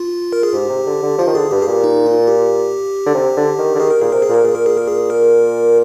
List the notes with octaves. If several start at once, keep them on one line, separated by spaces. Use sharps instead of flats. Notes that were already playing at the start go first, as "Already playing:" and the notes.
Already playing: F4
A#4
G#4
G#2 G4
C3
D3
D3
F3 F4
D#3
D3 G#4
G2 G4
G#4
A#2 G4
D#4
F4
G4
D3
C3
D3
D#3
D3
D#3 G#4
A#4
A#2 G#4
C3 A#4
G#4
A#2
A#4
A#2 G#4
A#4
G#4
A#4
G#4
A#4